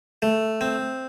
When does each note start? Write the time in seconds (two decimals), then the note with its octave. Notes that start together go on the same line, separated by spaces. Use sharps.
0.22 A3
0.61 C4